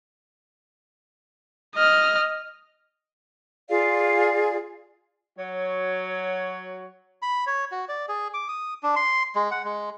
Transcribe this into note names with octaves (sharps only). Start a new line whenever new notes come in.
D#5 F6
F4 G#4 D5 F5
F#3 C#5
B5
C#5
F#4
D5
G#4
D6
D#6
D4
C6
G#3
F#5
G#3